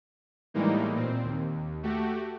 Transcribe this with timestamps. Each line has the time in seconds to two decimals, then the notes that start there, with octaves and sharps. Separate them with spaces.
0.54 A2 E3 G3 G#3 A#3 D#4
0.94 A#2 C4
1.24 D#2
1.83 A3 F#4 G4